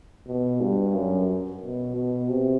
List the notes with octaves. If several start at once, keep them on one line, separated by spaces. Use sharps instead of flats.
B2
G2
F#2
B2
B2
C3